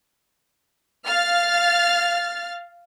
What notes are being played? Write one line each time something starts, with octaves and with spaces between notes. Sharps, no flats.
F5 F6 A6